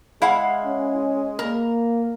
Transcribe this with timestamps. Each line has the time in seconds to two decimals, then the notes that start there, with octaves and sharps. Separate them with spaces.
0.22 G#3 E4 F5 F#5
0.65 C#4
1.39 A#3 A#4